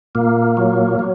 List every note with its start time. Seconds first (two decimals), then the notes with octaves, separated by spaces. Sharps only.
0.15 A#2 A#3
0.57 F#3
0.99 F#3